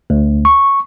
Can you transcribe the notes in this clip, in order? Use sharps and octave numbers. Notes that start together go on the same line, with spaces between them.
D2
C#6